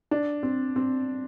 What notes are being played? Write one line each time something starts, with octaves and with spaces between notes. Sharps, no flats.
D4
C4
C4